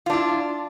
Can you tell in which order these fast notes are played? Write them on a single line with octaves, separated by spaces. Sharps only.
F4 D4 E4